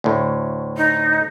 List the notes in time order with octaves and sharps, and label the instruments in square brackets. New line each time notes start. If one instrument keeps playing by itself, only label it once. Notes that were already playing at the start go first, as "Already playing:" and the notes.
[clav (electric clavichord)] D2 A2
[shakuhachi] D#4